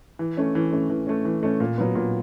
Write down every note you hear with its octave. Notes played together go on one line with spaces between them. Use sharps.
E3
A3 C#4
E3
A3 C#4
E3
A3 C#4
E3
A3 C#4
A#2
F#3 B3
A#2